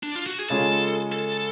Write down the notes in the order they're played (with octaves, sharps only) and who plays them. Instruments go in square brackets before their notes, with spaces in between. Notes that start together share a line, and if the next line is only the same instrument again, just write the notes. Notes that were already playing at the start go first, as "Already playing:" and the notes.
[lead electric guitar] D4
F4
F#4
G#4
[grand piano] C#3 G#3 C#4 F4 G#4 [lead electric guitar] A4
[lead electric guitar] A4